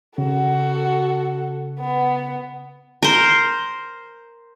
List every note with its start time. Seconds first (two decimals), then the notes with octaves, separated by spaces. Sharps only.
0.18 C#3 F#4 A4
1.80 B3
3.03 A#4 C5